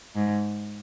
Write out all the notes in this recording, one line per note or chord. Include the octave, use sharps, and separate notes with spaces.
G#2